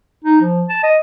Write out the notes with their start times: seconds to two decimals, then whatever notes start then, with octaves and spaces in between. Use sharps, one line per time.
0.25 D#4
0.41 F3
0.69 A5
0.83 D#5